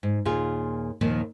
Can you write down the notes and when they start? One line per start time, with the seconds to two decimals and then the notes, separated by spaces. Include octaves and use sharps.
0.03 G#2
0.25 D#2 A#2 F4 G#4
1.01 D#2 A#2 D#3 F3